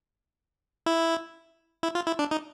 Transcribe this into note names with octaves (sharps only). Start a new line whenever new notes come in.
E4
E4
F4
E4
D4
D#4